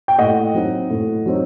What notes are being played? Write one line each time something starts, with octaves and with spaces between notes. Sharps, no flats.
G5
A2 D#5 F#5
F#3 C4 D#4
A2
F#3 C4 D#4